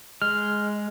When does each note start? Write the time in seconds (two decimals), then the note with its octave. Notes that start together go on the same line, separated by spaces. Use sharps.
0.22 G#3 F6